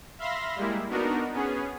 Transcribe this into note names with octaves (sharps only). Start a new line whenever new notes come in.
E5 F5 B5 C6 A#6
G3 G#3 A#3 E4
B3 D4 D#4 F#4 A#4
B3 C#4 G#4